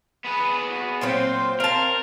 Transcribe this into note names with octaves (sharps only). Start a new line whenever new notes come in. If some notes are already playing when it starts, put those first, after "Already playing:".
B3 G#4 B4
F#4
A#2 F#3 C4 F4 C5
C4 A#4 F5 A5